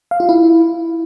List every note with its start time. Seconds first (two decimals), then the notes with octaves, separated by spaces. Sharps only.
0.11 F5
0.20 F4
0.29 E4